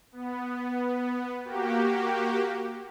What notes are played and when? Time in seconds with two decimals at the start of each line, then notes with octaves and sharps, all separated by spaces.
0.12 B3
1.44 A#3 F#4 G4